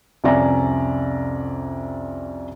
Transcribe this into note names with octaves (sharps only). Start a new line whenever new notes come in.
C2 F2 C#4 D5 E5 A#5